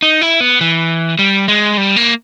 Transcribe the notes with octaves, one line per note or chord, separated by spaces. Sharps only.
D#4
E4
B3
E3
G3
G#3
G3
A#3